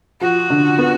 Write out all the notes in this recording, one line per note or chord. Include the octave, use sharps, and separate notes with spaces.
F3 F#4
D3
B3